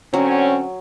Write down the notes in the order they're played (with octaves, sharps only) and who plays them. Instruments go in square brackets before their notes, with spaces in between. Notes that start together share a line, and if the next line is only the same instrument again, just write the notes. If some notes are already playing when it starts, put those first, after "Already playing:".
[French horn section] D3 C4 C#4 [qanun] F#3